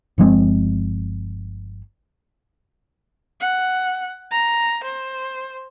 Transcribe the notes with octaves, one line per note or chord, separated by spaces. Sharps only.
G1 F3 G#3 C4
F#5
A#5
C5